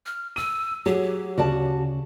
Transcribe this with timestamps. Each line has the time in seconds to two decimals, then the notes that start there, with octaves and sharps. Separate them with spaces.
0.06 F6
0.36 E6 D#7
0.86 F#3 G4 G#4
1.38 D2 C#3 C#4 F#4 D5 A5